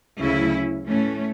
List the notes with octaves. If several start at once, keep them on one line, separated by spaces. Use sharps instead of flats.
D2 C#3 F#3 C#4 E4
A2 E3 A3 C#4